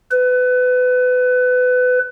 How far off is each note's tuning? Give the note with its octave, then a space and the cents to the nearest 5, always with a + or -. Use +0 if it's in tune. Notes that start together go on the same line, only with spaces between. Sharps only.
B4 +25